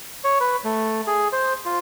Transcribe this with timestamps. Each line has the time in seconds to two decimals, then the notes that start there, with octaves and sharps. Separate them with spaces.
0.24 C#5
0.40 B4
0.64 A3
1.07 G#4
1.33 C5
1.65 F4